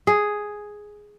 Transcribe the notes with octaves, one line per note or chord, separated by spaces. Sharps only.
G#4